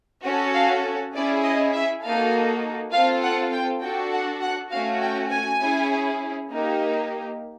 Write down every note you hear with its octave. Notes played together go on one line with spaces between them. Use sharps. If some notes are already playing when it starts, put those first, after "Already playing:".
C#4 F#4 A4 F#5
F5
C#4 E4 G#4 D5
D#5
E5
A#3 D#4 F#4 A4 F5
C4 F4 A4 F5
F#5
G5
D4 F#4 A4 G5
F#5
F#5
A3 C#4 F#4 F5
G5
G#5
C#4 E4 G#4
A#3 D#4 G4